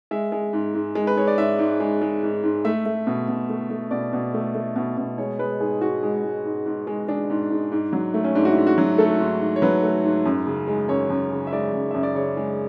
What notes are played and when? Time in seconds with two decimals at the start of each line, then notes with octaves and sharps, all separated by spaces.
0.11 G#3 E5
0.32 G#3
0.53 G#2
0.74 G#2
0.95 G#3
1.07 B4
1.17 G#3 C#5
1.27 D5
1.38 G#2 E5
1.59 G#2
1.80 G#3
2.02 G#3
2.23 G#2
2.43 G#2
2.65 A3 E5
2.86 A3
3.07 B2
3.28 B2
3.49 A3
3.70 A3
3.91 B2 D5
4.13 B2
4.34 A3
4.55 A3
4.76 B2
4.97 B2
5.18 G#3 C#5
5.39 G#3 B4
5.60 G#2 G#4
5.81 G#2 F#4
6.03 G#3
6.24 G#3
6.45 G#2
6.66 G#2
6.87 G#3
7.08 G#3 D4
7.30 G#2
7.51 G#2
7.72 G#2
7.93 F#3
8.14 A3
8.24 C#4
8.35 G#2 D4
8.45 F#4
8.51 E4
8.57 G#2
8.67 F#4
8.78 F#3
8.98 A3 A4
9.19 G#2
9.41 G#2
9.56 C#5
9.62 F#3 B4
9.83 A3
10.04 G#2
10.25 F#2
10.47 C#3
10.68 G#3
10.89 F#2 C#5
11.10 F#2
11.31 C#3
11.47 E5
11.52 G#3 D5
11.73 F#2
11.91 F#2 E5
12.03 D5
12.15 C#3 C#5
12.37 G#3